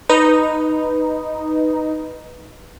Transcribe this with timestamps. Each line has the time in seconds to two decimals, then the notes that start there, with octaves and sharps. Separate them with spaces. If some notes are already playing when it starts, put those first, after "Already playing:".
0.09 D#4 B4